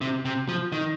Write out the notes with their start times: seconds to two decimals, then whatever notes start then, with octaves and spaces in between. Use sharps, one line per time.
0.01 C3
0.25 C3
0.48 F3
0.72 D#3